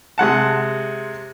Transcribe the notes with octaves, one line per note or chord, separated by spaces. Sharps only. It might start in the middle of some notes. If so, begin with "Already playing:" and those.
C3 G#3 F#5 A5